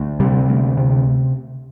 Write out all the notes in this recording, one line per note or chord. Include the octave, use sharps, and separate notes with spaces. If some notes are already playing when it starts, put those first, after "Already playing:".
Already playing: D2
C3 G3
D2
C3